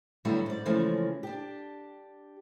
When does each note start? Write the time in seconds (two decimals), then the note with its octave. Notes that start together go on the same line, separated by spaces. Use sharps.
0.25 A2 D3 F#3 G3 B3 E4
0.46 G#2 D5
0.65 C#3 E3 F3 G#3 A3 C#4
1.23 D4 G4